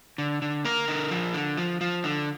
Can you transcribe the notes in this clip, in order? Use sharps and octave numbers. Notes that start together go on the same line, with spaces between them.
D3
D3
A#3 A#4
D3
F3
D3
F3
F3
D3